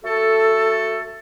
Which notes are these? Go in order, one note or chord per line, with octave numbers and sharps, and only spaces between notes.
A3 F#4 A4